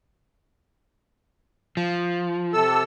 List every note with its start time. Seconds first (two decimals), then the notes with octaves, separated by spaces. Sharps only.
1.77 F3
2.53 C3 A4 E6